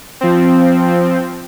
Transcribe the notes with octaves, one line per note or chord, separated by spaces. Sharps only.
F3 C4